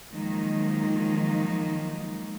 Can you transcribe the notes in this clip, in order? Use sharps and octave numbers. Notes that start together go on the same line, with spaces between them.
D#3 F3 F#3 G#3 A#3 D#4